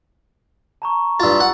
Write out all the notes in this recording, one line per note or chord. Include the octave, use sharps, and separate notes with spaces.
A5 A#5 C#6
G2 F4 E6 A6
F#5